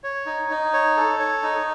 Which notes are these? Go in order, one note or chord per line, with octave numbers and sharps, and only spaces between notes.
C#5
D#4
D#4
C#5
A4
C#5
D#4